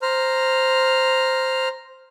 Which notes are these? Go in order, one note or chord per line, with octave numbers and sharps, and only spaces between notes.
C5 A#5 F6